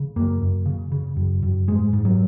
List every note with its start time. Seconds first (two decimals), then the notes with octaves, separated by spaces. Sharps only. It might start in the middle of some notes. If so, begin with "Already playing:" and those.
Already playing: C#3
0.16 F#2 A#3
0.41 F#2
0.66 C#3
0.92 C#3
1.16 F#2
1.43 F#2
1.67 G#2 G#3
1.93 G#2
2.05 F#3